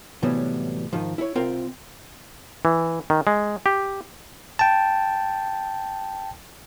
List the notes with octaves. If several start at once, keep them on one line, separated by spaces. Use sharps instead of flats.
A2 C3 E3 F#3 G3 B3
G#2 D#3 F3
E4 C#5
C2 C4 F4 A#4 G5
E3
D#3
G#3
G4
G5 A5